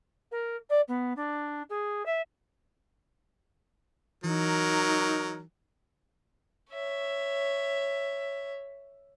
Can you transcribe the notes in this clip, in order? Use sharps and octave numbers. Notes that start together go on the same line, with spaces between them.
A#4
D5
B3
D4
G#4
E5
E3 F#3 D#4 A#4
C#5 E5